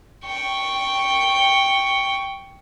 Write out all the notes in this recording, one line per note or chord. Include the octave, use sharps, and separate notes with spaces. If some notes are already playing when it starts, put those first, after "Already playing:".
G5 C#6